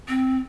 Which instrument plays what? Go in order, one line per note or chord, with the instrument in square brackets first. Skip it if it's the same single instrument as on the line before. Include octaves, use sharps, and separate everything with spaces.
[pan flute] C4